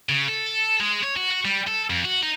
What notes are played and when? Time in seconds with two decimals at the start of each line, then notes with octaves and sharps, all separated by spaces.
0.09 C#3
0.28 A4
0.81 G#3
1.04 C#5
1.17 F#4
1.31 F#4
1.45 G3
1.67 A4
1.90 F2
2.05 F#4
2.22 D#4